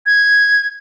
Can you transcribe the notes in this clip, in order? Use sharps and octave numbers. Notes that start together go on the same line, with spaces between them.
G#6